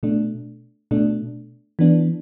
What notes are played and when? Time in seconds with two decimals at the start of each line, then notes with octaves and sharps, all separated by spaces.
0.03 B2 A3 D4
0.91 B2 A3 D4
1.79 E3 B3 D4